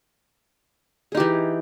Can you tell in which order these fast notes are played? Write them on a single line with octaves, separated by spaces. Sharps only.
G#4 D#4 G4 E3